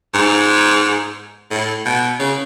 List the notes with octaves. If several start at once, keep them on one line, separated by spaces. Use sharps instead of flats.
G#2
A2
B2
C#3